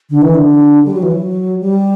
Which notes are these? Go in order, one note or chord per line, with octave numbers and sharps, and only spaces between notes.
D3
E3
D3
G3
F#3
E3
F#3
G3